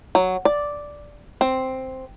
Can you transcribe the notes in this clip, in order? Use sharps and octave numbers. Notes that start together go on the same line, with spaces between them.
F#3
D5
C4